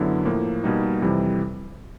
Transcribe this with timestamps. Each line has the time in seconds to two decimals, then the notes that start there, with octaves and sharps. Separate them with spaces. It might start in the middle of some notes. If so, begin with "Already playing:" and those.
Already playing: F#2 D3 F#3 B3 E4
0.25 A2 F3 A#3
0.64 B2 G3 A#3 D#4
1.02 F2 C3 E3 G3